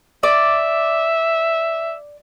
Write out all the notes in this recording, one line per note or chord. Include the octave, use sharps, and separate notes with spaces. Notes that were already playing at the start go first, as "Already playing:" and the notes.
D5 E5